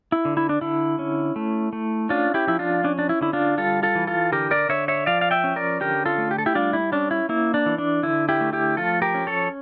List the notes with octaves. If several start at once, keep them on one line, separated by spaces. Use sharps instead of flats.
E4
D3
E4
D4
D3 E4
C#4
A3
A3
C#4 D4 F4
E4 G4
F3 E4
D4 F4
C#4 D4
D4
E4
D3 E4
D4 F4
G3 F4 A4
F4 A4
E3
F4 A4
D3 G4 A#4
A#4 D5
D3 C#5 E5
C#5 E5
F3 D5 F5
F5
E5 G5
C#4
A#4 D5
D3 G4 A#4
F4 A4
A3
G4
A4
E4 G4
G3 D4 F4
E4
C#4 D4
E4
A#3 E4
D4
E3
D4
D3 E4
E4 G4
A3
E4 G4
F3 F4 A4
G4 A#4
C#4
A4 C#5